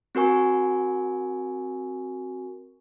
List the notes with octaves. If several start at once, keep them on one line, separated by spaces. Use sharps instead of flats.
C4 F#4 A#4 G#5 C#6